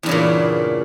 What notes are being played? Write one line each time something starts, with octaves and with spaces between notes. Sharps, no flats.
E2 G2 A#2 C#3